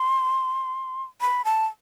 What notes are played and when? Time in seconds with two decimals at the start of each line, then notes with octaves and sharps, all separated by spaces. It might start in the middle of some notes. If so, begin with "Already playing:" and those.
Already playing: C6
1.21 B5
1.45 A5